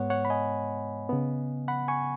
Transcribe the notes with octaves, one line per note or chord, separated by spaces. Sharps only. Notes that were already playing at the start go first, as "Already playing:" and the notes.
Already playing: G#2 G#3 B3 C#5 F#5
C#5 F#5
B5
D#5 G#5
C#3 B3
F#5 B5
G#5 C#6